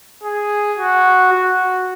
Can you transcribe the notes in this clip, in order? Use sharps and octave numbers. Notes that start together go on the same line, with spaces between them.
G#4
F#4
F#4